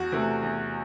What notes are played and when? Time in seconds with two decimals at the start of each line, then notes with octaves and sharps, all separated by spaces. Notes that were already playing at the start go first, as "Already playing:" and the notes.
Already playing: E2 F#4
0.12 C3 E3 A3
0.43 E2